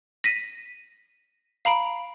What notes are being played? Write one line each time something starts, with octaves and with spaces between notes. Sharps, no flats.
A#6 B6 D#7
F5 A#5 B5 D7